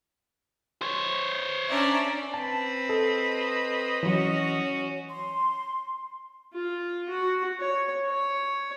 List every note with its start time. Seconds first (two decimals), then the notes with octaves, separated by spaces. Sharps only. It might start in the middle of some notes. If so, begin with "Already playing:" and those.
0.82 C5 C#5
1.70 C#4 D4 D5 E5 A#5
2.34 C4 B4 A5
2.89 A4 D#5
4.03 E3 F#3 C#4 F#4
5.10 C6
6.54 F4
7.09 F#4
7.60 C#5
8.10 C#5